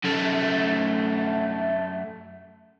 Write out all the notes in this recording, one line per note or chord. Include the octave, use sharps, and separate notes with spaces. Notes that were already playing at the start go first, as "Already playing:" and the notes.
F#2 A3